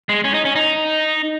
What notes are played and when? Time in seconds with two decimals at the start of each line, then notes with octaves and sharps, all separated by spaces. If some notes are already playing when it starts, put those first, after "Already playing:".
0.09 G#3
0.24 C#4
0.34 D#4
0.45 C#4
0.56 D#4